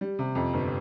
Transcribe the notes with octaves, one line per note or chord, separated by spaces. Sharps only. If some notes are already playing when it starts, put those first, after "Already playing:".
G3
C3
F2
G1